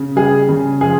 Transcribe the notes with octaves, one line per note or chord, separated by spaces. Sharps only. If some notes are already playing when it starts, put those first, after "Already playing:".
Already playing: C#3
G3 G#4
C#3
F3 G#4